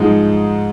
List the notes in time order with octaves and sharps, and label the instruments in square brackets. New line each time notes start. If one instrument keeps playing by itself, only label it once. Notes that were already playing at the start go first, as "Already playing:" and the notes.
Already playing: [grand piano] G#2 F3 G#3 D#4